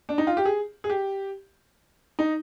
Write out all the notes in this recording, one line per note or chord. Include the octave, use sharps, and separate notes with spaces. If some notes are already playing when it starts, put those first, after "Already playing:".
D4
D#4
F4
G4
G#4
G#4
G4
D#4